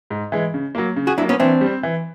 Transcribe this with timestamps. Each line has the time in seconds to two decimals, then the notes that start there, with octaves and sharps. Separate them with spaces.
0.10 G#2
0.32 E3 G#3
0.54 C#3
0.75 F#3 A#3
0.96 C#3
1.07 F#4 G#4
1.18 F#3 D4 E4
1.22 A#3
1.29 B3 C#4
1.40 E3 C4 D4
1.61 G3
1.66 C4
1.83 E3